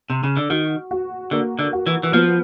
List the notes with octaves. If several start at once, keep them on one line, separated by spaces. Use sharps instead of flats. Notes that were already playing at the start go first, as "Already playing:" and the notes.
C3
C#3
D3
D#3 F#4
F#4
D3 A#3
D3
F#4
E3
E3
F3 B3